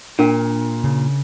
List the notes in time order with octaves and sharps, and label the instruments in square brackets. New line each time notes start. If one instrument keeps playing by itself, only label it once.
[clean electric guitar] A#2 [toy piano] D4 A#4 G5
[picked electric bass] C#3